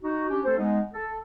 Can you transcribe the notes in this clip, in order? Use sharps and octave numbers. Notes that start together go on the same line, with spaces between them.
D#4 F#4
C#4 D4 G4
A3 C4 A4 C5
G#3 B3 D#4
A4